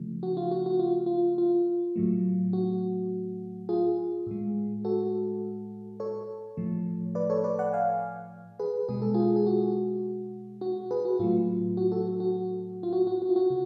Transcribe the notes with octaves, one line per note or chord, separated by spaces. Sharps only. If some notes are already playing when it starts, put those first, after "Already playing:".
Already playing: C#3 F3 A3
F#4
F4
F#4
F#4
F4
F4
F4
A2 F#3 A3
F#4
F4 G#4
A2 G#3
F#4 A4
A4 C#5
A2 F3 A3
B4 D5
A4 C#5
B4 D5
D5 F#5
F5 G#5
G#4 B4
B2 G#3 G#4
A4
F4 G#4
G#4
F#4
F#4
G#4 B4
F#4
A2 F#3 A3 F4
F#4
F#4 A4
F#4
F4
F#4
F#4
F#4
F4
F#4
C#3